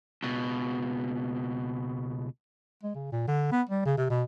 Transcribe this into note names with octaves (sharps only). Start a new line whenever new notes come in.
C#2 B2
G#3
C#3
A#2
D3
B3
G3
C#3
C3
B2